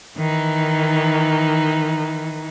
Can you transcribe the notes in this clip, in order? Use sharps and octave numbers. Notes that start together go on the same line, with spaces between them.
D#3 E3 D#4